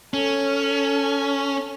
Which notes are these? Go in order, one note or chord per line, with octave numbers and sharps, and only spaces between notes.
C#4 A4